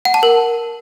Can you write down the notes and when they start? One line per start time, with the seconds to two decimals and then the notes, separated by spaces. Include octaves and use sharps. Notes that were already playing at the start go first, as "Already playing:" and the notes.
0.05 F#5
0.14 A5
0.23 A#4